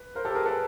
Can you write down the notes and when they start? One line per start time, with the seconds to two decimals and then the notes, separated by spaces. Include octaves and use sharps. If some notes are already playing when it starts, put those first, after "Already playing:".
Already playing: B4
0.15 A#4 C5
0.25 G4 A4
0.35 G#4 A#4
0.46 A4 B4